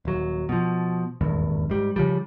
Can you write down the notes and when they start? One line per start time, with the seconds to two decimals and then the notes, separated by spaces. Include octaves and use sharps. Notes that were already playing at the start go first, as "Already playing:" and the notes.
0.05 D#1 F#3
0.49 B2 F3
1.21 D#1 G#1 E2 G2
1.70 G#2 G3
1.96 C#3 F3 G3